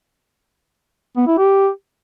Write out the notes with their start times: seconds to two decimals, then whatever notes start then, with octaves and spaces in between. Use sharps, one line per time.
1.16 B3
1.27 E4
1.38 G4